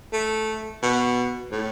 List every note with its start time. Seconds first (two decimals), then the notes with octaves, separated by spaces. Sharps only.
0.12 A3
0.82 B2
1.51 A2